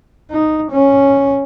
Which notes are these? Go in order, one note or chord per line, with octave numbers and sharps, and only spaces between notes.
D#4
C#4